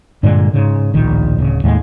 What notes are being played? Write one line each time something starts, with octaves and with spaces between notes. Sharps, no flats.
G2 A#2 D3 G#3
G#2 C#3
D1 A#1 D#3
D1 C#3
D#2 A2 G#3